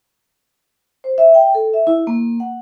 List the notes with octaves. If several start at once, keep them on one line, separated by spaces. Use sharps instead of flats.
C5
E5
G5
A4
E5
E4
A#3
F#5